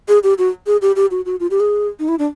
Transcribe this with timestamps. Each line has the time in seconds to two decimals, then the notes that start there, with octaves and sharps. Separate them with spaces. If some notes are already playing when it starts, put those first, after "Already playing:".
0.08 G#4
0.23 G4
0.38 F#4
0.67 G#4
0.82 G4
0.96 G4
1.11 F#4
1.26 F#4
1.40 F4
1.51 G4
1.60 G#4
1.99 D#4
2.08 E4
2.19 D4